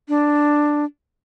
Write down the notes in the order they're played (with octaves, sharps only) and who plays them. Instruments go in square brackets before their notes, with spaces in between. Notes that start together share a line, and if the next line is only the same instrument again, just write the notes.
[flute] D4